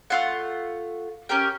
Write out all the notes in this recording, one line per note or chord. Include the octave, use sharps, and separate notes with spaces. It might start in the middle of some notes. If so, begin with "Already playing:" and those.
A3 F4 F#5
C#4 G4 A#4 G5